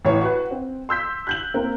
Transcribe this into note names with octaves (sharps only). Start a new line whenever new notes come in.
A1 E4 C#5
F#4 B4
C4
C6 E6 G6 B6
F#6 G6 F#7
A#3 C4 A#4